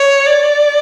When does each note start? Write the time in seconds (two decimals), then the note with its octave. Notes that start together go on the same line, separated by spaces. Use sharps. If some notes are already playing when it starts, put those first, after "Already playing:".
Already playing: C#5
0.26 D5